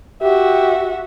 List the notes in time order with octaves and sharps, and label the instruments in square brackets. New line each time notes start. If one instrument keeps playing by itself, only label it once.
[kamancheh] F#4 E5 [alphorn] G4